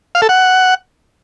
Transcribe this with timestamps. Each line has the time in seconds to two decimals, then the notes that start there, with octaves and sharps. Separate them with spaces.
0.15 F5
0.22 A4
0.29 F#5